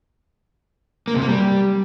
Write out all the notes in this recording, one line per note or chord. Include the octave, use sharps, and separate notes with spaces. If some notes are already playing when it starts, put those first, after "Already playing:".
A#3
C3
A#3
G3